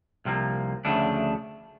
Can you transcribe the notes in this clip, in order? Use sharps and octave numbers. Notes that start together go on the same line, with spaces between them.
C2 C3 F3 A#3
D2 C#3 F3 A3 D4